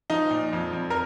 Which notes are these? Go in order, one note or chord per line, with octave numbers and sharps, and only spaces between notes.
F3 D#4
A#2
F2
F2
A#4